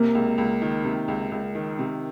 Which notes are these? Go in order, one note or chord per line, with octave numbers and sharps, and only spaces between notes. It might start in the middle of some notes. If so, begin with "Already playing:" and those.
Already playing: C3 A#3
C#2
C#2
D#3
C3
C#2
C#2
D#3
C3